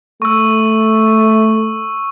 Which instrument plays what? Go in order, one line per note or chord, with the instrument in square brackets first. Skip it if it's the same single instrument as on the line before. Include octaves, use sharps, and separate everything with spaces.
[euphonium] A3 [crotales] C#6 E6